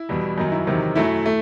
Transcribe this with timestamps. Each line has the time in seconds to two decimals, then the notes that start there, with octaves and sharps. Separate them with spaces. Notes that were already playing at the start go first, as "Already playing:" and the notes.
Already playing: E4
0.09 E2 B2 G3
0.38 F#2 D#3 F#3 D#4
0.52 E4
0.67 E2 C3 D#3 F#3
0.96 F#2 F#3 A3 E4
1.26 A3